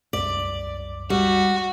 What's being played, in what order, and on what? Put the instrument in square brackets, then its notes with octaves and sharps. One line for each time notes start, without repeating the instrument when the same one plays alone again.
[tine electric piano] C2 F#2 B6 [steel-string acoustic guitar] D5
[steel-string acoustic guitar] G3 [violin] F#4